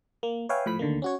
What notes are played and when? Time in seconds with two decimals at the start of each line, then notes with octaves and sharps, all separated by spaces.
0.23 A#3
0.49 B4 C#5 E5 F5 G5 G#5
0.66 A2 F3 B5 B6
0.79 D2 D3 D#3 A#3
1.02 C#4 F#4 C#5